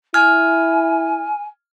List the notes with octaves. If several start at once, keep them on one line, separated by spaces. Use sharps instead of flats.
E4 G#5 F6 G#6